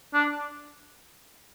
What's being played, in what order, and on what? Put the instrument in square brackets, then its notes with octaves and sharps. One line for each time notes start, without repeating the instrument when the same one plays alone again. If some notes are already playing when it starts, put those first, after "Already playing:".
[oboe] D4